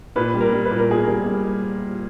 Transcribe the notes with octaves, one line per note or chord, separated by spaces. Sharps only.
A#2 B4
G3
A#4
G3
B4
A#2
A#4
A#2 G#4
G3 A#4
G3